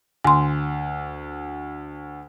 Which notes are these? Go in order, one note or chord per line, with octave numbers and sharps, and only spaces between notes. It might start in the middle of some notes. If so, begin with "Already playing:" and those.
D2 G#5 C6